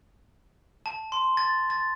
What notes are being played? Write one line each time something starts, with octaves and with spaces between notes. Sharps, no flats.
A5
C6
A6
A6